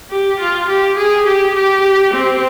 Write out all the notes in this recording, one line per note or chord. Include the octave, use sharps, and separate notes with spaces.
G4
F4
G4
G#4
G4
G4
C4